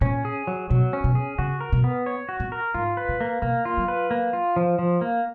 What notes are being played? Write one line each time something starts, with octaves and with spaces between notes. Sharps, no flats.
A#2 C#4
G#4
F#3
B2 F#3
C#4
B2
G#4
C#3 F#4
A#4
B2
B3
C#5
F#4
A#2
A#4
G#2 F4
B4
A#2
A#3
B2 A#3
F4
F#3
B4
A#3
F4
F3
F3
A#3